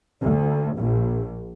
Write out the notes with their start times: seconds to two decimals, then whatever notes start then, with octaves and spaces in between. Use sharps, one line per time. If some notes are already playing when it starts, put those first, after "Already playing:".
0.22 D2
0.77 A#1